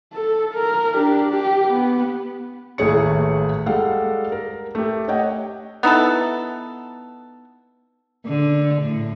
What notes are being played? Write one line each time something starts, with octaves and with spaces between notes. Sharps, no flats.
A4
A#4
D4 G4
G4
B3
A1 D#2 A3 G#4 C#5 C#7
G3 G#3 A4 F5 F#5
A#4
A3 G4
C#5 D#5 F#5 G5
B3 D#4 E4 A4
D3
A2